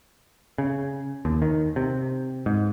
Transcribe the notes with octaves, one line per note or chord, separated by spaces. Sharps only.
C#3
D#2
D#3
C3
G#2